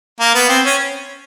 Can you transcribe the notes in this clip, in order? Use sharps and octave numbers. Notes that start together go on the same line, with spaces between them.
A#3
B3
C4
C#4